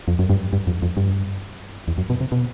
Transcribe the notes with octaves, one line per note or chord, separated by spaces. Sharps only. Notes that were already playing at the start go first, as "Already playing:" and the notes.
F2
F#2
G2
G2
F2
F2
G2
E2
F#2
B2
C3
B2